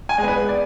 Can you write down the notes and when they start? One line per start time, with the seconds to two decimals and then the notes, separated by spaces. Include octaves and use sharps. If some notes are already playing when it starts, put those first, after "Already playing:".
0.09 G#5
0.18 G#3
0.23 B3 B4
0.49 D5